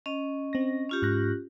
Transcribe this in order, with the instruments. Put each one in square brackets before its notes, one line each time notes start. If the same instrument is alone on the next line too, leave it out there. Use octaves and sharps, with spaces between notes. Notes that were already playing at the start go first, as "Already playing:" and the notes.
[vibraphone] C#4 D#5
[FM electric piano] C4 A#6
[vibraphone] C#4 F4 G4
[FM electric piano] G#2 F#6 A#6